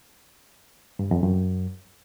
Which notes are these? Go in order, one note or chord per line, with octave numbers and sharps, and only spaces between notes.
G2
F2
F#2